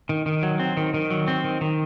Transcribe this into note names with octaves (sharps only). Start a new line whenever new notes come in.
D#3
D#3
F#3
C4
D#3
D#3
F#3
C4
D#3
D#3